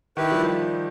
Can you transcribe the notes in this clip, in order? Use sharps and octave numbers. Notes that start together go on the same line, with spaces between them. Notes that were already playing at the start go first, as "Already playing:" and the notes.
D#3 E4 G4 B4
F3 G3